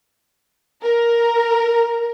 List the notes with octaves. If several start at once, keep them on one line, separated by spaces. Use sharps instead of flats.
A#4